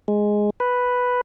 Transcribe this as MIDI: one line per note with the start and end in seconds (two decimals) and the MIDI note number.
0.08 0.50 56
0.60 1.21 71